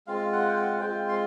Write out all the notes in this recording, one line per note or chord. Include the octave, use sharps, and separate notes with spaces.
G#3 C4 F4 F5
F#5
G5
F#5
G#3 C4 F4 G5
C6